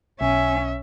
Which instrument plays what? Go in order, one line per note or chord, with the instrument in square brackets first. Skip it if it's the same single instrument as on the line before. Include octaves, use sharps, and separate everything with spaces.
[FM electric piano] B1 [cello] C#4 [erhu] E5 [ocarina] G#5